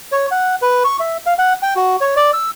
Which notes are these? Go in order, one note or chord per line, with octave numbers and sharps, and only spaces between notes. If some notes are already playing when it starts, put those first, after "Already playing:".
C#5
F#5
B4
C#6
E5
F5
F#5
G5
F#4
C#5
D5
E6